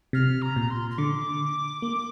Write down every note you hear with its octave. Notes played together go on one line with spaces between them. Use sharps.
C3 F6
A#5
A#2
C6
C6
D3 D6
A#3